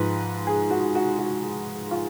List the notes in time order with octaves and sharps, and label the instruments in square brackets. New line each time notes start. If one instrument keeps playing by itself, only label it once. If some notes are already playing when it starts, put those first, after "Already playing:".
Already playing: [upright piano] G#2 F3 G#3 B4
G#4
F#4
F#4
F#4
F4